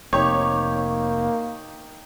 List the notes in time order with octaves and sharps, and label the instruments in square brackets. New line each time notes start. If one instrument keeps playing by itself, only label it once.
[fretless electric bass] F1 C3 [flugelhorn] A#3 [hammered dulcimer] D#4 G4 [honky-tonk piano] C#5